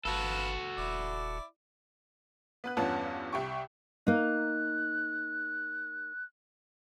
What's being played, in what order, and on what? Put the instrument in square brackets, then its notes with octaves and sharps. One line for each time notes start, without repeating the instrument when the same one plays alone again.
[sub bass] G1 [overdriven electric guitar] F#4 A4 [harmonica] B4 F5 A5
[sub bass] D#1 [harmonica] E4 D5
[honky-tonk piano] B3 B4 F#6
E2 G2 B3 C#4 F4 A5
C2 G4 C#6
[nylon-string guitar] A#3 D#4 [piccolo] F#6